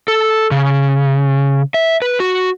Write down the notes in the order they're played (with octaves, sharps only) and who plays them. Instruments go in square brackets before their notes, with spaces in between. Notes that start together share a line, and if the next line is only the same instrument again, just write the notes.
[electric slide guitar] A4
C#3
E5
B4
F#4